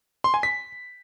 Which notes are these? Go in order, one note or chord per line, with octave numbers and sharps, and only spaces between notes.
C6
G#5
B6